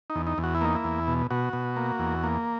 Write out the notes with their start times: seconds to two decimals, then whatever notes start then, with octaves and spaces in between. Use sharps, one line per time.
0.10 D#4
0.15 E2
0.27 D#4
0.38 E2
0.43 F#4
0.55 E4
0.61 A#3 D#4
0.75 E4
0.84 E2
1.08 B2
1.31 B2 F#4
1.53 B2
1.76 A#3
1.99 E2
2.23 A#3